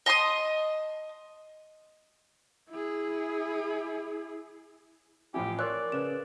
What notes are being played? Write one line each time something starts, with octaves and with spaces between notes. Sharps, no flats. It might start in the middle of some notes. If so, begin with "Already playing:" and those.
D#5 A5 C6 D#6
E4 G#4
A1 F3 E4 G4 G#5
A#4 C#5 D5 C6 E6 F#6
C#3 B4 E7